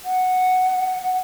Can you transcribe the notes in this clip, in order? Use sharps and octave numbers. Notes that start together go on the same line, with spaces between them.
F#5